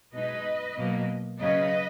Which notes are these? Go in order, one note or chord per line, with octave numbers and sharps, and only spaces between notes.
B2 G#3 D#4 B4 D#5
B2 F#3 A#3
C#3 F#3 C#4 B4 D#5